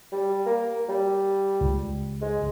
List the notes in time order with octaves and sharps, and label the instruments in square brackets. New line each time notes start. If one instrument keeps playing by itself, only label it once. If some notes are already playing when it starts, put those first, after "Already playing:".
[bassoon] G3
A#3
G3
[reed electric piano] C#2
[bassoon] G#3